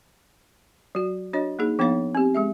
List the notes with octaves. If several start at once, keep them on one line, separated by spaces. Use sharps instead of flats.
F#3 F#4
D4 F#4 C#5 D#5
A#3 D#4 G#4
F3 B3 D4 D#4 C#5 F5
C4 G4
G#3 G#4 E5